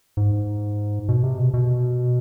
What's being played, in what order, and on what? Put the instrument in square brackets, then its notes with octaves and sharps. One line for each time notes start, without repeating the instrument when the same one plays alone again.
[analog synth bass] G#2
B2
C3
B2
B2